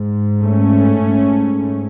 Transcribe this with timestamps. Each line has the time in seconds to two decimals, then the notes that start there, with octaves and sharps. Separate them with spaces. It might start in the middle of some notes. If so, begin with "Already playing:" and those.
Already playing: G#2
0.41 A3 C#4
1.04 G#2